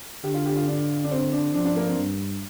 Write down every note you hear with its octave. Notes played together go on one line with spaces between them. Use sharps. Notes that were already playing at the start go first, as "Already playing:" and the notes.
D3 G4
F4
G4
F4
D4
D4
C4
D4
F3 D4
D4
A#3
C4
G2